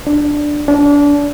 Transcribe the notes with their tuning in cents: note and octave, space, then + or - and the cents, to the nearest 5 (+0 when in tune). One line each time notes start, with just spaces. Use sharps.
D4 +0
D4 -30